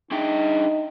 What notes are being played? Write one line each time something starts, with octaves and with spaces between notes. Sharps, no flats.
D4 D#4 G#4 G5